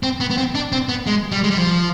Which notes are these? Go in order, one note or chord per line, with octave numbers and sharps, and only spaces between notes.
C4
B3
B3
C4
D4
C4
B3
G#3
G3
G#3
G3
F3